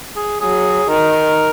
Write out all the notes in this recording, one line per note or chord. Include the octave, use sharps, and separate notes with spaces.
G#4
F#3 G#4
D#3 A#4